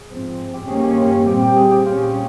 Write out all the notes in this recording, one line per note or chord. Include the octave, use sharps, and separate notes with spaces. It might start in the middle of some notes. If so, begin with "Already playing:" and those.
Already playing: G#4
G#2 F3 C4
G4
G2 D#3 A#3 C#4 G#4
G4
F4
A#2 G3 C4 G4
G4
G#4
G4
A#2 G3 C#4 F4